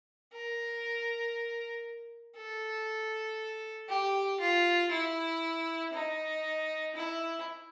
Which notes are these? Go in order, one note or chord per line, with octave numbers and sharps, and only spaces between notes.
A#4
A4
G4
F4
E4
D#4
E4